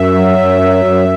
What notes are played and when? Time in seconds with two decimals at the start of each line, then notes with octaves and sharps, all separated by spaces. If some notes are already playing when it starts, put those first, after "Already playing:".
Already playing: F#2 E5
0.15 F#3
0.38 F#2
0.61 F#3
0.85 F#2